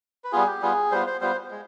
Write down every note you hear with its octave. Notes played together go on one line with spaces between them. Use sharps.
B4
G3 B3 F4 G#4
G4
G3 B3 F4 G#4
G3 B3 F4 C5
C5
G3 B3 F4 C5
G#3